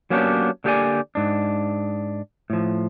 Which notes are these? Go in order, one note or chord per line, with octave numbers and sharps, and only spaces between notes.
F#3 A#3 B3 C#4 D4 G4
D3 A#3 G4 G#4 D5 G#5
G#2 D4
A2 F3